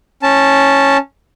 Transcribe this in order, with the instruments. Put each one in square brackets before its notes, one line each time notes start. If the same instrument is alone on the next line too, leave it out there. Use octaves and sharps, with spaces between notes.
[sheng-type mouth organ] C#4 A5